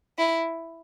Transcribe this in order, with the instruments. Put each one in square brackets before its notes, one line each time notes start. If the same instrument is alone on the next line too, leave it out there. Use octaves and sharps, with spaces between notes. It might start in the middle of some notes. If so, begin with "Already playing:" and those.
[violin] E4